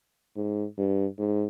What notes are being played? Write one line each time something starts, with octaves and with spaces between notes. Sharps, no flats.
G#2
G2
G#2